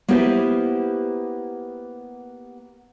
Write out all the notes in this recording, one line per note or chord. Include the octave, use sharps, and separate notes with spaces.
A#3 B3 E4 G4 B4 C5